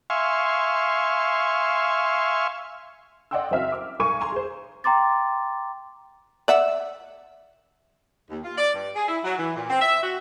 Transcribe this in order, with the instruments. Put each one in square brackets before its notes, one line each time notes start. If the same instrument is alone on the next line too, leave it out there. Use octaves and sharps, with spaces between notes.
[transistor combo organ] E5 F5 G#5 C6 C#6
[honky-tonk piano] D5 D#5 F#5 G5 C6 E6
F#1 C4 F#4 E5 F5 F6
D6
B1 A#4 G#5 C#6 D#7
G#5 A#5 C6
G#4 C5
[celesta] G5 A#5 C6 D6 A6
[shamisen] D5 E5 F#5
[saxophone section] D#2
F4
D5
G2
G#4
E4
F#3
E3
A#2
C4
E5
F#4